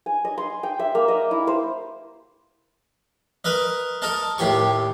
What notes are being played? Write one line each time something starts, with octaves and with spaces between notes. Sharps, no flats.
G#5
D#5
C6
G5
E5
A#3
D#5
E4
C5
A#4 B4 D#5
A4 A#4 D#5 A5
D#2 A2 G4 C#6